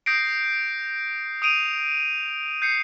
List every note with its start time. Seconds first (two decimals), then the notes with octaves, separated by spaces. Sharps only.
0.06 D#6 G6 A#6 C7 D7
1.42 D#6 D7 D#7 F7
2.62 G6 C7 C#7